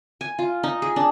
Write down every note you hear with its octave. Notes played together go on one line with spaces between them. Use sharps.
G#5
F4
D#4
G#4
D4